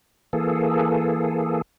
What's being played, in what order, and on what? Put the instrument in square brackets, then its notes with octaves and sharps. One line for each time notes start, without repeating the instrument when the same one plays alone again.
[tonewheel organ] E3 A#3 G#4 A4